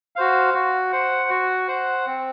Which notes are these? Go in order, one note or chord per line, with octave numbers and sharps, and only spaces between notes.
F#4 C5 F5
F#4
C5 F#5
F#4
C5 F#5
C4